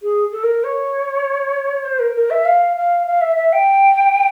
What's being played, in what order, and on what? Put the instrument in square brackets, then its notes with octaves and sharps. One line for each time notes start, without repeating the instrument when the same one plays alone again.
[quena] G#4
A4
A#4
C#5
C5
A#4
A#4
E5
F5
F5
F5
E5
E5
G5